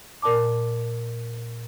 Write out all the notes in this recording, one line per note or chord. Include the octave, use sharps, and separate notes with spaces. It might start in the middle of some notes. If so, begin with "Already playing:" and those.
A#2 A#4 D5 A5 D6